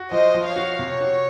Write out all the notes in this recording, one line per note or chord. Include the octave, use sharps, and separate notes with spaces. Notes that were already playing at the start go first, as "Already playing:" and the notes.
Already playing: F#4
F3 C5 D#5
F3
C#5 F5
F#4
C3 C#5
F#4